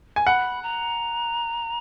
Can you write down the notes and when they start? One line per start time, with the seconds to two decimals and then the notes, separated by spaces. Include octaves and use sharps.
0.16 G#5
0.27 F#5 B5
0.63 A#5